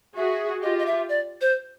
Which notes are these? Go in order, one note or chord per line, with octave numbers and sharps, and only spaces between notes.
F#4 G#4 E5
F4 G4 D#5
D#5
E5
D5
C5